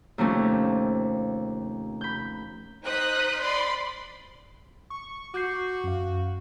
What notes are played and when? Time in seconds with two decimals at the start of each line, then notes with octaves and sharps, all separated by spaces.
0.18 D#2 C3 F3 A3 C#4
2.01 B5 G6
2.84 D#4 C5 D#5 D#6 F#6 B6
3.41 D5 B5 C6
4.90 C#6
5.34 F#4 D6 G6 C7
5.84 F#2 F5